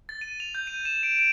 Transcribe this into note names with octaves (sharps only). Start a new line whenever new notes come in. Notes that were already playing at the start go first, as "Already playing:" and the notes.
A6
D#7
F7
G6
D#7
E7
D7
D7